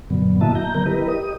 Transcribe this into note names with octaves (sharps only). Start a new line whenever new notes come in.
F#2 A#2 D3 F#3 B3
A#3 E4 F#4 D#5 E5 A5
A#5 G6
D3 F#3 B3 A#4 A#5 G6
E4 G4 A#4 B4 D#5
G4 D#5 D#6